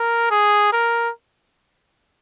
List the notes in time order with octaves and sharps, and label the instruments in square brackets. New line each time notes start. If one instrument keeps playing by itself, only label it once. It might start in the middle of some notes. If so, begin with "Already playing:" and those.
Already playing: [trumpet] A#4
G#4
A#4